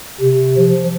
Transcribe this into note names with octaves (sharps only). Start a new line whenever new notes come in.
C3
F3